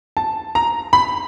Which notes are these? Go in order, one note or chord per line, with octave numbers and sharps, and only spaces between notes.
A5
A#5
B5